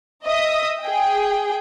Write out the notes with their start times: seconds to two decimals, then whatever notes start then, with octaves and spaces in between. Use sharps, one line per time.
0.24 D#5 E5 D#6
0.81 G#4 G5